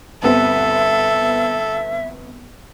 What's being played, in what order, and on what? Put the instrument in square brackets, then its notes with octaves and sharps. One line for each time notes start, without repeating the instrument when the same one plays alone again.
[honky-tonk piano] G1 B3 C4 [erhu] A4 [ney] E5